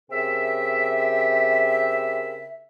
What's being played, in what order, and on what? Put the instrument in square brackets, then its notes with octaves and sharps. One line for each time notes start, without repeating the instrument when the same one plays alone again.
[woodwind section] C#3 C4 G4 A#4 E5